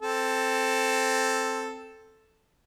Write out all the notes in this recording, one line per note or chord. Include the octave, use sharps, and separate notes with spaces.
C4 A4